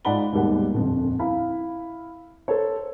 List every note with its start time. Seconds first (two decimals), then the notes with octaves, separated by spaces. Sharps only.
0.05 G#2 F4 D5 F#5 B5 G7
0.32 D#2 G#2 B2 G3 A#3 F#5
0.74 D#1 F2 D3
1.19 E4 F5 B5
2.48 A4 C5 C#5